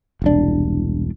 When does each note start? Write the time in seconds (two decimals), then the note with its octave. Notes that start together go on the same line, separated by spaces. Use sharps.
0.22 E1 C2 D4